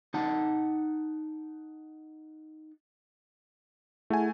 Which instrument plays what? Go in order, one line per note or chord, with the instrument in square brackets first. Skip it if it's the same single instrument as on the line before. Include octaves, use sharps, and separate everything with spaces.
[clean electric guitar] D#4 F#5 A5
[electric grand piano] A3 G#5 [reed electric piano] E4 G#4 F#5